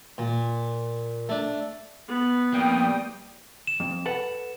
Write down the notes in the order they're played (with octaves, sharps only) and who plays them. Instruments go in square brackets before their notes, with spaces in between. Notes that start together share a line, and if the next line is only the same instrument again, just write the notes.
[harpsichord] A#2
A3 D4
[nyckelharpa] B3
[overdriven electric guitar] F2 A#3 [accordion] G3 G5 D#6
[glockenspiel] E7
[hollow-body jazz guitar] F2
A4 B4 F#5